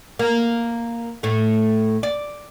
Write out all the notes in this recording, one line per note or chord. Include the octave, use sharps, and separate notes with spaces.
A#3
A2 A3
D5